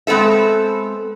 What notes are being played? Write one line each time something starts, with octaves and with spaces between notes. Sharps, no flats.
G#3 B3 C4 A4 E5